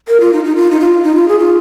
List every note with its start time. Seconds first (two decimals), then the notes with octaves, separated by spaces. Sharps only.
0.08 A#4
0.20 F4
0.33 D#4
0.44 D#4
0.56 F4
0.71 D#4
0.80 F4
1.03 D#4
1.15 F4
1.28 G#4
1.39 F4